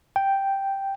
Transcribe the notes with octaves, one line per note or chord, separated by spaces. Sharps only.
G5